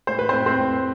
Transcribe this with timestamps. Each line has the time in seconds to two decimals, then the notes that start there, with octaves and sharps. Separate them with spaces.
0.07 A2 C5
0.19 B4
0.29 A2 C4 C5
0.46 C4 C5
0.60 A2